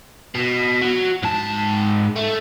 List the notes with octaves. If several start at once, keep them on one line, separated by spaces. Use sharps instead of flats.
B2
F#3
G#2 A5
A3